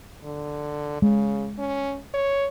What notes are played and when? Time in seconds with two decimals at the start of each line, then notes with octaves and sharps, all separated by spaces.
0.24 D3
1.02 C#3 G#3
1.59 C#4
2.14 C#5